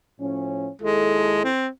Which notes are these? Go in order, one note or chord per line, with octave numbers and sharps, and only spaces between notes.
A2 F3 C#4
D#2 G#3 E4 A4
C4